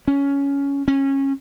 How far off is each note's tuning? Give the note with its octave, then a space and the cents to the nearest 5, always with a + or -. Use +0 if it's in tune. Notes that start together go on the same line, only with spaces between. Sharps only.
C#4 +15
C#4 -20